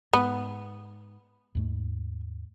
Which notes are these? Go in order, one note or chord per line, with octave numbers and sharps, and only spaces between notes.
G#2 B3
D#2 G#2 A3